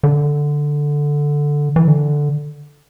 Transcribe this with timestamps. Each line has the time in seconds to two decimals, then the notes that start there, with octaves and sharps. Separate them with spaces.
0.03 D3
1.76 E3
1.88 D3